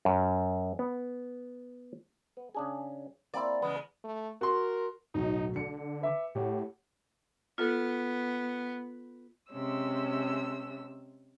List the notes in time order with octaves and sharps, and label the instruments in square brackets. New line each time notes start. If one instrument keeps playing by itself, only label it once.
[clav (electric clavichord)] F#2
B3
B3
C#3 D4 G#4
[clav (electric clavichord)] A#3 C4 E4 [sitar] D5
[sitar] E2 C#3 G#3 [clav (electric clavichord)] B3
[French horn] A3
[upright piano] F#4 C6 [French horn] A#4
[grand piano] D1 B1 F#3 [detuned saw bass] D#4
[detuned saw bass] D3 [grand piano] C#7
[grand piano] B4 E5 D6
[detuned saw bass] A2 [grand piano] G4 C#5 F#5
[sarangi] B3 [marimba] F4 A4
[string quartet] C3 G#3 C#4 E6